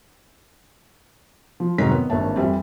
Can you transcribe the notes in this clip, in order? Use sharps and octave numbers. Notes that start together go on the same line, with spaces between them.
F3
F1 G#2 D#3 F#3 C#5 B6
B3
G#1 G2 A#2 C#5 E5 A5
F2 E3 G3 C4